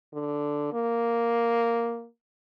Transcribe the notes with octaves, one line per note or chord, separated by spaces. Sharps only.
D3
A#3